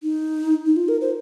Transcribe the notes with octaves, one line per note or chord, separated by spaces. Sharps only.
D#4
D#4
F4
A#4
C5